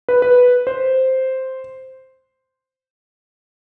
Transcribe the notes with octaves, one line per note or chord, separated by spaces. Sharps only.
B4
B4
C5